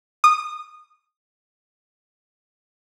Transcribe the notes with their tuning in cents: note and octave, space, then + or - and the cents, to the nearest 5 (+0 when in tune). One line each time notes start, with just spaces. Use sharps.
D#6 -20